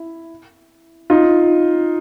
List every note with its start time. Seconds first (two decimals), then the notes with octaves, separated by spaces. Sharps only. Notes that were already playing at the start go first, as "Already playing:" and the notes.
Already playing: E4
1.10 D#4 F4